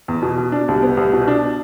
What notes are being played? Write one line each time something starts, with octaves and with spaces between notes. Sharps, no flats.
E2
B2
B2
D4
C2
B3
C2
B2
D4